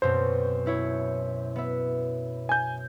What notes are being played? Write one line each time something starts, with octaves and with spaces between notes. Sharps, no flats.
F#2 B2 C4 C5
B3 E4 C#5
B3 E5
G#5 G6